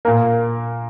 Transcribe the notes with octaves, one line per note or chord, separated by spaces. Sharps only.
A#2 A#3 A#4